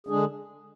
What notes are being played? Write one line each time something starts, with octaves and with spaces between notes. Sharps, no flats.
D3 G#3 D4 G#4